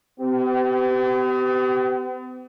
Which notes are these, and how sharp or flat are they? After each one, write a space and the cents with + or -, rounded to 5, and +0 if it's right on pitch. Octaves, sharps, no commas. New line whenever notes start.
B3 +45 G4 -25